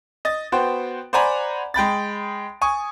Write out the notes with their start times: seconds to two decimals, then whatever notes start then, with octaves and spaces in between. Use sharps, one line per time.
0.25 D#5 A6
0.52 B3 F#4 C5 G5
1.13 C5 D5 F#5 G#5 A#5 B5
1.74 G#3 G5 B5 A6
2.62 G#5 C#6 D#6